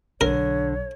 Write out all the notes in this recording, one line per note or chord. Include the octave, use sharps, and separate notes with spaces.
B1 D3 A#4 C#5